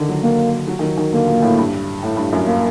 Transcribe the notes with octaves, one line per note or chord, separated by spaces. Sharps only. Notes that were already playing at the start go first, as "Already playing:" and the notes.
Already playing: D3 D#3
F#3
A#3
F#3
D#3
F#3
D#3
D3 A#3
A#2
A2
G2
A2
G2
F#2
A#3